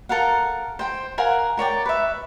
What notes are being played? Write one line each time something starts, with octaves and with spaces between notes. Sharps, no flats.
A4 A#4 F5 F#5
C5 G5
A#4 F5 F#5 G#5
A#4 C#5 D5 G5
B4 E5